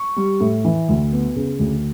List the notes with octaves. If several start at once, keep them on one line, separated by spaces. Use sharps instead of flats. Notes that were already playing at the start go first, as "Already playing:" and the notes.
Already playing: C#6
G3
A2
E3
D2
B3
C#3
D2